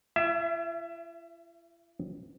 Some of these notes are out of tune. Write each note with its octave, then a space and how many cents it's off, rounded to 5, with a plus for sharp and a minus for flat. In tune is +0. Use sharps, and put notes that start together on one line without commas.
E4 +45 E5 +15